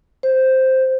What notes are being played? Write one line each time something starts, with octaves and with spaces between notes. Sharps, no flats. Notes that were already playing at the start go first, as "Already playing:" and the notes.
C5